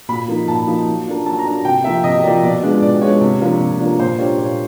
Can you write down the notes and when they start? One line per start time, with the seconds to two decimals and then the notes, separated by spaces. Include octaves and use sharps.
0.09 A#2 B5
0.28 F3 A#3 D#4
0.48 A#2 A5
0.67 F3 A#3 D#4
0.87 F#3
1.06 A#3 D4 F4
1.26 F#3 A5
1.39 A#5
1.45 A#3 D4 F4
1.65 C3 G5
1.84 F3 A#3 E5
2.04 C3 D#5
2.23 F3 A#3 D5
2.43 B2 D5
2.62 G#3 B3 D4 F4
2.82 B2 D5
3.02 G#3 B3 D4 F4 C#5
3.21 C3
3.41 F3 A#3 D4 F4
3.60 C3
3.80 F3 A#3 D4 F4
3.99 A#2 C5
4.19 G3 A#3 D4 F4 C#5
4.38 A#2 C#5